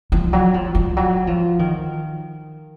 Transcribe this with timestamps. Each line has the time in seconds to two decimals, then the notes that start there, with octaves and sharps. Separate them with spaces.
0.12 F3
0.33 F#3
0.54 F3
0.75 F3
0.97 F#3
1.27 F3
1.59 D#3